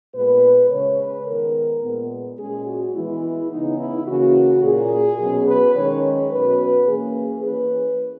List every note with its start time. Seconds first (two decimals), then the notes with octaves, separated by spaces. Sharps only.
0.15 A#2 G#3 B3 B4
0.70 C#3 G#3 C#4 C#5
0.99 B4
1.26 D#3 G#3 B3 A#4
1.83 A#2 G#3 B3
2.38 A#2 G#3 C#4 G#4
2.66 F#4
2.94 E3 G#3 B3 E4
3.50 C#3 E3 B3 D#4
3.79 E4
4.07 C#3 E3 A#3 C#4 F#4
4.64 A#2 A#3 C#4 G#4
5.19 B2 F#3 C#4
5.48 B4
5.75 D#3 G#3 C#4 C#5
6.04 C#5
6.31 B2 F#3 C#4 B4
6.87 E3 A#3 C#4 G#4
7.43 E3 A#3 C#4 B4